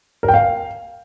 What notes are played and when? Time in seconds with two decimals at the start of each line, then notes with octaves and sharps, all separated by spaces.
0.23 A#4
0.28 G5
0.34 F5